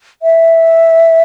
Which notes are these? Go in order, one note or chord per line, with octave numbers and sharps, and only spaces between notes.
E5